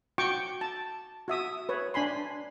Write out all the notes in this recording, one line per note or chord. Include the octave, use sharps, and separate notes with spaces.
F#4 G5 C#6 D6
A5
F#4 E5 D#6
B4 C#5
D4 G#5 B5 C6